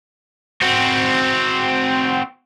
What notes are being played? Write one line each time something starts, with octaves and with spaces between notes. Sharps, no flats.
C4 F#4